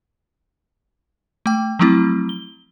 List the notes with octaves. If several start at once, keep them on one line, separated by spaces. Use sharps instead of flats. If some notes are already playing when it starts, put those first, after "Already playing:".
A3 G5
F3 F#3 A3 C4 E4
G7